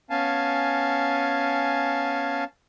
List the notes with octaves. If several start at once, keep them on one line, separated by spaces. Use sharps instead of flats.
B3 C#4 F5 G#5 A5